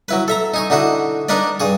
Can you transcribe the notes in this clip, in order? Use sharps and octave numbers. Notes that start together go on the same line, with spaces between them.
F#3 E4 B4
A4 E5 A#5
D#4 G#5 C#6
D3 D#4 E4 F#4
D4 D#4 A#4 B4 D5
G2 G#4 C#6